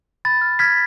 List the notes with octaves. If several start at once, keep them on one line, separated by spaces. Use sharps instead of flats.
B5 A6
F6
F6 G#6 B6